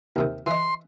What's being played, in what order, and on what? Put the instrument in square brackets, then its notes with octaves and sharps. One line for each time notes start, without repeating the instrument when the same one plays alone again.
[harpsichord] D#2 C3 D#3
[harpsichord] E3 D#5 [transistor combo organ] C6